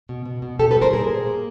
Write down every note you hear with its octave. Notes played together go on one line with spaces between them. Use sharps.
B2
B2
B2
B2 G4 A4
A4 B4
G3
A#4 C5
A#2 G#4 A#4
A#2
A#3